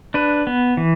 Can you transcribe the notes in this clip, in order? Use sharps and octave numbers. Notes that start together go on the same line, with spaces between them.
D4 B4
B3
E3